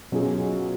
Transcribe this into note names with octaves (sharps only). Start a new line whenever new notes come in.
B2 F#3 C#4 F4 G#4